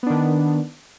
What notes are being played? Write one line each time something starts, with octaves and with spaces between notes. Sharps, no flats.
D#3 B3 D4